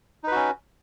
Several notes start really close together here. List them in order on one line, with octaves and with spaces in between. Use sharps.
D#4 B4 F#4 C#4